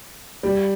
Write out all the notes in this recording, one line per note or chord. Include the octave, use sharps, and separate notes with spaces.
G3